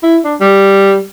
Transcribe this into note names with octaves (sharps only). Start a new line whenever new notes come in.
E4
D4
G3